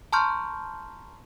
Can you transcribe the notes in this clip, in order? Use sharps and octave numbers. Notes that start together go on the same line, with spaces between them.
A5 A#5 C6 C#6 F6 G6